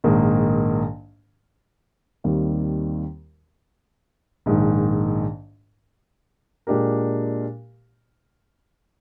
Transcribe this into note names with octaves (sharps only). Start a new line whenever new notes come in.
A#1 G#2 D#3 A#3
D#2 D#3 G3 C4
A#1 G#2 D#3
A#2 G#3 D4 G4 A#4